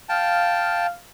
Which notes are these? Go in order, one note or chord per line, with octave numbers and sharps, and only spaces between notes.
F5 G5 A5